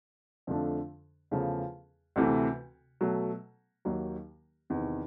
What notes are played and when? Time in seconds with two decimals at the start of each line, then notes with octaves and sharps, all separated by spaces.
0.47 F2 D3 F3 A3 D4
1.31 E2 C#3 F3 A3
2.16 D2 C3 E3 A3
3.01 B2 F#3 A3
3.85 D#2 D#3 F#3 A#3
4.70 E2 C3 D#3